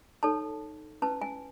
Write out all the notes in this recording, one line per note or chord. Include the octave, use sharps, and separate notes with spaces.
D#4 A4 C#5 A5
C#4 E4 B4 A5
G#5